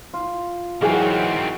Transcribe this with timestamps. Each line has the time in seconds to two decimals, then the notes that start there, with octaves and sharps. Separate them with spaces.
0.14 F4
0.82 D#3 E3 F#3 C4 F#4 G#4 F#5 G#5